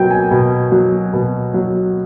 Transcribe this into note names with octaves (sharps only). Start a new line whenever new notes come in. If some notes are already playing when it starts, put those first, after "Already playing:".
Already playing: B2 F#3 G5
G#5
B2
F#3
B2
F#3